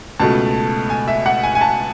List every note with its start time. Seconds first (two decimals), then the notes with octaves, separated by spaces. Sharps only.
0.20 C#2 B2 A3 A5
0.90 G#5
1.08 E5
1.26 F#5
1.43 G#5
1.55 G#5
1.61 A5